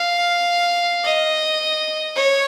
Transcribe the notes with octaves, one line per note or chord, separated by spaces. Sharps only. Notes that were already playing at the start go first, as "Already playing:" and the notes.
Already playing: F5
D#5
C#5